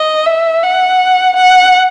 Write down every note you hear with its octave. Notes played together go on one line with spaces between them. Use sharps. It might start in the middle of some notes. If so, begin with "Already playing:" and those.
Already playing: D#5
E5
F#5
F#5